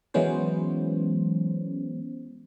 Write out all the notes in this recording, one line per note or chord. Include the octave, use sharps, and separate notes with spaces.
E3 F#3 G#3 B3 C#4 C5